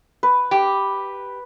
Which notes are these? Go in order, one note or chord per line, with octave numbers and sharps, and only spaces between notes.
B4
G4